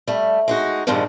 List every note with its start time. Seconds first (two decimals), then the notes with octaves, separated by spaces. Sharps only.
0.07 G3 A3
0.48 G#3 D#4 F#4
0.87 G2 A#2 D#3 F3 G3 G#3